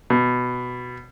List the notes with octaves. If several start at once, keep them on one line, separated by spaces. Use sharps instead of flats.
B2